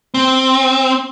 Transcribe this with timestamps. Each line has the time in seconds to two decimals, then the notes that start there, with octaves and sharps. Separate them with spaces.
0.14 C4